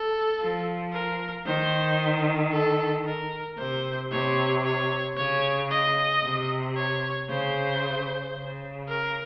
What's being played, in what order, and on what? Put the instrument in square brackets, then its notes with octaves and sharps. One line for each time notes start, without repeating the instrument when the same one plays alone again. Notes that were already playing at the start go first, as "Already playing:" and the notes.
Already playing: [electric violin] A4
[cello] F3
[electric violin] A#4
[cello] D#3 [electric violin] C5
[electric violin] A4
A#4
[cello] C3 [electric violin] C5
[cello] C3 [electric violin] C#5
[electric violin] C#5
[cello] C#3 [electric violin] C#5
[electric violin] D#5
[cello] C3
[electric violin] C#5
[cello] C#3 [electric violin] C5
[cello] C#3
[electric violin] A#4